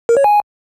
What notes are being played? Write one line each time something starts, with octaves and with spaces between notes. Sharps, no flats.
A#4
C#5
G#5